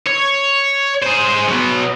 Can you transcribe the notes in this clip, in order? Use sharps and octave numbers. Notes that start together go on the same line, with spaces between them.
C#5
G#4 C5
F#3 B3